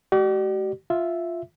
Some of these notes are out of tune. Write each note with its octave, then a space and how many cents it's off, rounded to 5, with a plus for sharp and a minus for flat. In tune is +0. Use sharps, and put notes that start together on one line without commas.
G#3 +40 G4 -45 D5 +30
F4 +0 E5 +0